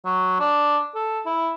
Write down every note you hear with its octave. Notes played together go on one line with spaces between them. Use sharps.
F#3
D4
A4
E4